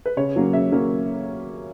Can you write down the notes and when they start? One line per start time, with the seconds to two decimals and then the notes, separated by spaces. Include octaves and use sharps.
0.06 B4
0.17 C#3 C#5
0.36 F#3 A#3 C#4
0.53 C#3 E5
0.72 F#3 A#3 C#4